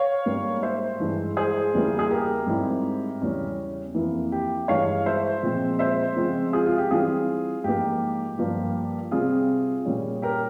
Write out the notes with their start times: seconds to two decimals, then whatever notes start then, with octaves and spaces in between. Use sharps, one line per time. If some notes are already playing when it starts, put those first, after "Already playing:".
Already playing: C#5 F5
0.26 G#2 G3 A#3
0.63 C5 E5
0.99 G2 E3 G#3
1.37 G#4 C5
1.73 E2 C#3 G3 A#3 E4
1.99 G#4
2.11 G4 A#4
2.47 G#2 G3 C4 E4
3.21 E2 C#3 G3 C#4
3.95 F2 E3 A#3 E4
4.32 G4
4.68 G2 E3 G#3 C#5 F5
5.06 C5 E5
5.43 A#2 F3 G#3 C4
5.79 C5 E5
6.16 C#3 F3 G#3 C4 F4
6.53 F4 G#4
6.66 F4
6.78 G4
6.91 E3 G3 C4 F4 G#4
7.64 G#2 F3 A#3 G4
8.39 G2 F3 A#3 F4
9.11 C3 G3 C4 F4 G#4
9.85 A#2 G3 C#4
10.22 G4 A#4